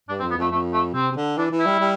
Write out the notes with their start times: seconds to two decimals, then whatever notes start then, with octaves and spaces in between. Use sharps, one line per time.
0.09 G2 D4
0.19 C4
0.23 F2
0.30 B3
0.37 F2 A3
0.51 F2 A3
0.73 A3
0.94 C3 C4
1.12 C3
1.16 D3
1.38 E3 D4
1.52 E3
1.59 E4
1.66 G3
1.80 G3